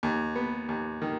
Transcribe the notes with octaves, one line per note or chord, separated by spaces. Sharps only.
D#2
B3
D#2
D#3